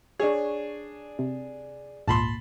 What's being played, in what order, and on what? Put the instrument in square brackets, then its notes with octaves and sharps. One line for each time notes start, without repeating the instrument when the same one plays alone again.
[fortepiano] D4 G#4 [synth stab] C#5
[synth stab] C3
[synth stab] G#1 C#2 A#2 [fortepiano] A5 B5 C6